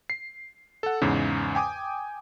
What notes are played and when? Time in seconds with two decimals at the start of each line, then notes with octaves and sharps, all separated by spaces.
0.10 C7
0.83 A4 F#5
1.01 E2 G#2 C#3
1.55 G5 G#5 D6 D#6